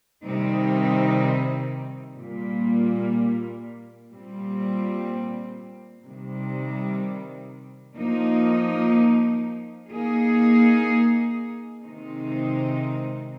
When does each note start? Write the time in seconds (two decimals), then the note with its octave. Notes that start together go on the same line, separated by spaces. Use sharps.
0.24 C3 D#3 G3 C4 D#4
2.17 A#2 G3 A#3
4.11 A#2 G3 C4
6.04 C3 D#3 G3
7.97 F3 A#3 D#4
9.90 A#3 D#4 G#4
11.83 C3 D#3 G#3 C4 D#4